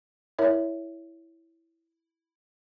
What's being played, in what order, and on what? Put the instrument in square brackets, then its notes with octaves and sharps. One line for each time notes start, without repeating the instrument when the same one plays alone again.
[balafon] E4 A#4 C#5 E5